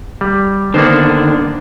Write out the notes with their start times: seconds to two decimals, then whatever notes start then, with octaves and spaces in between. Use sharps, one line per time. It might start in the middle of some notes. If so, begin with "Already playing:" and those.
0.21 G3
0.74 D3 D#3 A#3 B3 D4 C5